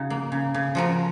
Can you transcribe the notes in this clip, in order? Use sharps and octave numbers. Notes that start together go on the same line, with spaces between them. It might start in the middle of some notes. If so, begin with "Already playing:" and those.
Already playing: C#3 D#4 F#4
A#3
C#3
C#3
F3 F#4 A#4